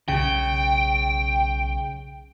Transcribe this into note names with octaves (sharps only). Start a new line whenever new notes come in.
B1 C#3 G5